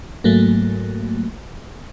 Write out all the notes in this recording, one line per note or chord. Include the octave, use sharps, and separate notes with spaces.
G#2 F#3 A3 A#3